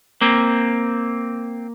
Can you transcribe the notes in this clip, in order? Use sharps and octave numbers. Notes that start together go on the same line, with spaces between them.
A#3 C4